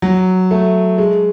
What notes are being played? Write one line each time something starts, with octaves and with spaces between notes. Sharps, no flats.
F#3
A3
G#3